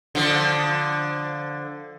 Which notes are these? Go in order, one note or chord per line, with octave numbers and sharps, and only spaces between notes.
D3 F3